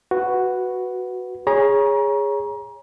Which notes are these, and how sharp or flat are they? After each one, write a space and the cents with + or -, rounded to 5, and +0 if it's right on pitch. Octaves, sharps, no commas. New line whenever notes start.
F#4 +0 B4 +0
G#4 -15 C#5 +0 A#5 +30